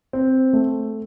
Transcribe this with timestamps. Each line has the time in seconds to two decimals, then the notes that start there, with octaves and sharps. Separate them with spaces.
0.13 C4
0.53 A3